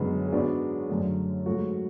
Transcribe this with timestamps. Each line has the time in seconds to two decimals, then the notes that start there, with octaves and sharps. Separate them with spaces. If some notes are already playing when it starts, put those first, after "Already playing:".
Already playing: F#2 D3 G#3 B3
0.28 G#4
0.32 G#2 G#3 B3 D4 F#4
0.89 F#2 D3 A3
1.46 G#2 F#3 A3 F#4 A4